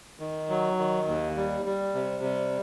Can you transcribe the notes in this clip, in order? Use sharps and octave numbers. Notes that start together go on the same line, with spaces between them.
D#3
F#3
D#3
D#2
G3
G3
C3
G3